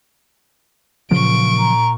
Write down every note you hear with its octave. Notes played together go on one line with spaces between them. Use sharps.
A#2 C#3 F3 F#3 C#6 D7
A#5